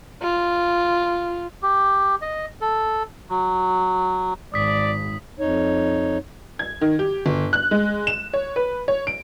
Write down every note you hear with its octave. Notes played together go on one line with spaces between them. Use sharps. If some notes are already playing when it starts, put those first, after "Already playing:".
F4
G4
D#5
A4
F#3
G#1 D5 D#6 B6
F2 D#4 C#5
G#6
D#3
G4
G1
F#6
G#3
E7
C#5
B4
C#5
D7